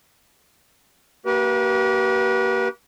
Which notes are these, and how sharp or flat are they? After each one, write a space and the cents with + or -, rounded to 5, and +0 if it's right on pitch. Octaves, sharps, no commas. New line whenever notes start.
A#3 -15 G4 -35 B4 -35